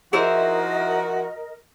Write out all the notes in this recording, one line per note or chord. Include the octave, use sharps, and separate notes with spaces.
F3 D#4 E4 F#4 G#4 A#4 C5 D#5